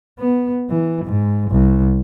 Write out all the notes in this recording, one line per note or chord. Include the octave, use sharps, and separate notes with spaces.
B3
E3
G#2
C2